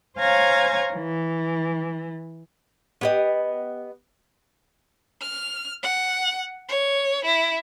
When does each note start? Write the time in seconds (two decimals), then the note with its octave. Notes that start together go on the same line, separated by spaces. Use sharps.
0.19 C5 C#5 F5 G#5 A#5 G#6
0.94 E3
3.01 B3 G4 D#5
5.21 F6
5.83 F#5
6.69 C#5
7.25 E4